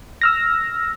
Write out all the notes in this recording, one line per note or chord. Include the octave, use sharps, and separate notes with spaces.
E6 F6 A#6